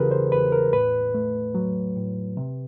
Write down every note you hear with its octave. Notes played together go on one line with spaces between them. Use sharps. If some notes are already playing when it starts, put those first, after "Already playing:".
Already playing: E2 C#3 E3 F4 G4 G#4 A#4 B4
C5
E2 B4
A#4
A2 B4
A3
F#3
A2
C3